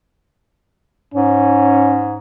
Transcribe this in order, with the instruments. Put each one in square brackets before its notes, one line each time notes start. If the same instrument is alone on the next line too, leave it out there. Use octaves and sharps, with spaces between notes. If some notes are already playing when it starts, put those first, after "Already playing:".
[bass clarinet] G#2 [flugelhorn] C#4